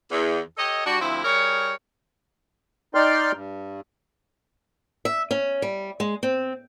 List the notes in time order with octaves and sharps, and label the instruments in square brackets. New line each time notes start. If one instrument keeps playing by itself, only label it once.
[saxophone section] E2
G4 A4 C#5 D#5
G3 D4 F#4
D2 F3 C4 E4
G3 G#4 A#4 C#5
[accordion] D#4 D5 G5 C6 F6
G2
[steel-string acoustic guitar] E5
C#4
G3
G#3
C4